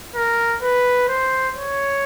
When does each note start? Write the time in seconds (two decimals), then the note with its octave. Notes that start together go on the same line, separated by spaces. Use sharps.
0.15 A#4
0.63 B4
1.08 C5
1.56 C#5